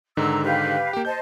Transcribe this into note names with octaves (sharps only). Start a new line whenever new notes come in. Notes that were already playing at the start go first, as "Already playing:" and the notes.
G#2 D3 D#3 A#5 E6
G4 B4 F5
A#3 G4 G5
C5 D#5 A5 G6